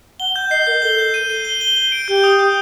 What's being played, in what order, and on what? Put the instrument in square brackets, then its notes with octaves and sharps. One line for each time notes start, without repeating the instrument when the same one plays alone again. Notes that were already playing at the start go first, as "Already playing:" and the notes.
[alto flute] F#5 [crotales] G7
[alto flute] F#5 [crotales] G6
[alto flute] D#5 [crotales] C7
[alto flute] A#4 [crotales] G6
[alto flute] A4 [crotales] G7
[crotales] G6
D#7
D#7
G7
G7
G7
D7
[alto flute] G4 [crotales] G6
[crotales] D#6
G6